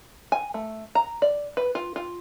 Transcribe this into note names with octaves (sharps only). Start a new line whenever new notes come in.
G#5
A3
A#5
D5
B4
F4
F4